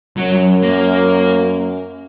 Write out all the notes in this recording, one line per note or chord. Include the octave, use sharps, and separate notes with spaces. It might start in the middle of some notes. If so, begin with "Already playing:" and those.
F#2 F#3
A#3